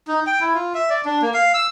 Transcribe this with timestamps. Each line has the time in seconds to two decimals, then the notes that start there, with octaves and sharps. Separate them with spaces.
0.08 D#4
0.27 G5
0.41 E4
0.55 F4
0.74 E5
0.90 D5
1.05 D4
1.22 A#3
1.34 F5
1.54 E6